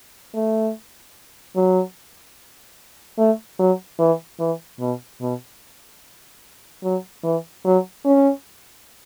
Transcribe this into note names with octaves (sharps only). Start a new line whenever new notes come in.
A3
F#3
A3
F#3
E3
E3
B2
B2
F#3
E3
F#3
C#4